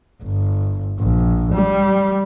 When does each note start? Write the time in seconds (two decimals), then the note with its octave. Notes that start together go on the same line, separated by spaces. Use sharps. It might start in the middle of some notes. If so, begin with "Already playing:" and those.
0.23 G1
0.99 A#1
1.54 G3